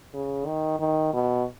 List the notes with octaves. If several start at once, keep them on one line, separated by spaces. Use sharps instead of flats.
C#3
D#3
D#3
B2